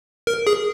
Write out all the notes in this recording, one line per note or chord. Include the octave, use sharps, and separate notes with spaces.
A#4
G#4